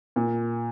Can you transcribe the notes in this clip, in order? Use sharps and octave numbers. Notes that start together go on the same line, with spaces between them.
A#2